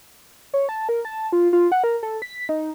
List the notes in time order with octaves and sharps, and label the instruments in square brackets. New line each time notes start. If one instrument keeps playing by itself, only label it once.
[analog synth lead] C#5
A5
A#4
A5
F4
F4
F#5
A#4
A4
B6
D#4